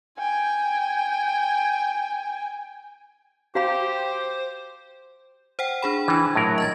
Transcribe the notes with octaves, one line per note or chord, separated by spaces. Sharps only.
G5 G#5
F#4 G4 C5 F5 B5
C5 F#5 G5
D4 G#4 B5
E3 D4 G#6
A2 F#3 A#4
D#5 G#6 A6